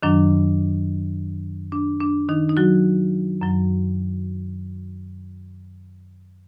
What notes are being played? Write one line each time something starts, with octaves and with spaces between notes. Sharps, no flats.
F#2 D#3 F#3 D4
D4
D4
D#3 D#4
D#4
F#3 F#4
F#2 F#3